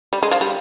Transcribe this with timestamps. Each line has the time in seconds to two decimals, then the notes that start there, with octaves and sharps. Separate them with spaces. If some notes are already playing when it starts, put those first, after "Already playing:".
0.13 G3
0.23 G#3
0.31 F3
0.41 G3